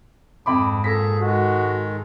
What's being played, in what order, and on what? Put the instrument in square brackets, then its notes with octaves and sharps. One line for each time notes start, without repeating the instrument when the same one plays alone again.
[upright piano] F2 B5 D6 [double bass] G#2
[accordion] A#2 G#4 [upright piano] A4 A#6 B6
[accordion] D#3 G#3 [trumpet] F#4